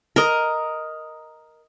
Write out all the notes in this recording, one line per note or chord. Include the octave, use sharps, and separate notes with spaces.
A#4 D#5